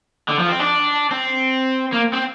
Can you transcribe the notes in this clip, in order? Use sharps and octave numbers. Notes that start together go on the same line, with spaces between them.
D3
F3
C4
D4
C4
A#3
C4